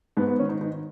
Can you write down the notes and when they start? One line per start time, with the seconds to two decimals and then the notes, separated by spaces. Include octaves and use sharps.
0.17 G#2 B3
0.28 B3
0.39 D#3 C#4
0.49 D#4
0.61 D#3 D#4